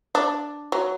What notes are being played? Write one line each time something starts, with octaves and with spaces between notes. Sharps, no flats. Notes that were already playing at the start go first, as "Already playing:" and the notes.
D4
F#3